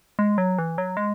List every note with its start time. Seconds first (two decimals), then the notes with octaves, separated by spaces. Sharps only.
0.19 G#3
0.38 F#3
0.58 E3
0.78 F#3
0.97 G#3